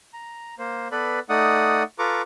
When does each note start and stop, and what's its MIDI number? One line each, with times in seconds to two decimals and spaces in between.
0.13 0.55 82
0.59 0.88 58
0.59 0.88 72
0.92 1.20 59
0.92 1.20 69
0.92 1.20 71
0.92 1.20 74
0.92 1.20 83
1.29 1.83 57
1.29 1.83 63
1.29 1.83 74
1.29 1.83 78
1.29 1.83 87
1.99 2.22 65
1.99 2.22 69
1.99 2.22 71
1.99 2.22 82
1.99 2.22 85
1.99 2.22 86